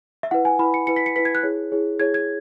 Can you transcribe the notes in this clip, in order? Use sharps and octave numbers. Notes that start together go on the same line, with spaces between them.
E5
E4 B4 F#5
G#5
E4 B4 B5
C#7
E4 B4 C#7
B6
C#7
E4 B4 B6
G#6
F#6
E4 G#4 C#5
E4 G#4 C#5
E4 G#4 C#5 G#6
G#6